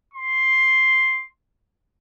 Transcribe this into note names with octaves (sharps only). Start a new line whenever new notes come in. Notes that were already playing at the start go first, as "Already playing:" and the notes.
C6